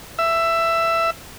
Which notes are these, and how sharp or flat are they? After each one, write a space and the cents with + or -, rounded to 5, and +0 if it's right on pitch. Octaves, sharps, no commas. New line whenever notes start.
E5 +10